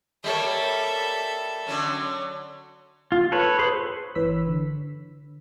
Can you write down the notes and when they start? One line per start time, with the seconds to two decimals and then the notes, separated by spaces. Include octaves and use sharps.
0.24 G3 A#3 A4 C#5 E5
1.67 D3 F#3 C#4
3.12 F4
3.32 A4 B4 C#5
3.59 G#4 B4 C5 B5 C6
4.15 G1 E3 B4 C#5 E6 B6
4.47 D3